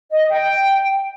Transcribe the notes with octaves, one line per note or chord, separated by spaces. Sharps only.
D#5
G5